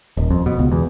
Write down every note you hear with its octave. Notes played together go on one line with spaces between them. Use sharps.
D#1
F2
B2
C#2
E2